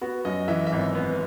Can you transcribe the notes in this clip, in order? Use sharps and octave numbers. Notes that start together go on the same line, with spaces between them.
B3 F#4
F#2 D#5
E3 E5
E5
G#1
B3